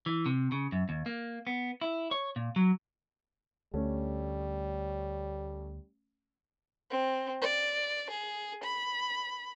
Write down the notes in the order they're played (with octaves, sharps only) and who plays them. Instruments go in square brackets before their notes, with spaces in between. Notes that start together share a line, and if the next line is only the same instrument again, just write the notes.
[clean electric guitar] E3
C3
C#3
F#2
D#2
A#3
B3
E4
C#5
A#2
F#3
[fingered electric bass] D2 [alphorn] G3 [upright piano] A3 C#4
[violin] C4
D5
G#4
B5